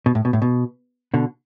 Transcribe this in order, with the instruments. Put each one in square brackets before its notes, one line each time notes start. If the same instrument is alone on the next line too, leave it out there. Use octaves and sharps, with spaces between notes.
[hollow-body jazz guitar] B2
A2
B2
A2
B2
B2 D3